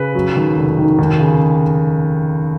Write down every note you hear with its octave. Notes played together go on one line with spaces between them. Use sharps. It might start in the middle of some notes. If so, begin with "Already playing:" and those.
Already playing: C#3 B4
F#3
D#2
F1
D#3
D#2
C#3